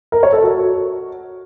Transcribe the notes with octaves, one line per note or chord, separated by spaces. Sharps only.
A#4
C#5
A4
F#4